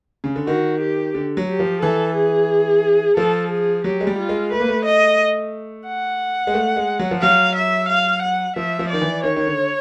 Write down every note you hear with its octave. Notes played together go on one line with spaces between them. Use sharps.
C#3
D3
D#3 F#4
G4
D3
F#3
G4
F3
E3 A4
G#4
F3 A4
G#4
F#3 G4
G#3
G3
F4
G#3
A3 B4
A#3
A3
D#5
F#5
G#3
A3
G#3
F#3
F3
F#3 F5
E5
F5
F#5
F3 E5
F3
D#3 D5
E3
D#3 C#5
D#3
D3